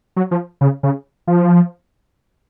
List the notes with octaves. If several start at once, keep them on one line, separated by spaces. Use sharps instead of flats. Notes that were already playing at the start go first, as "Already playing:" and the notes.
F#3
F3
C#3
C#3
F3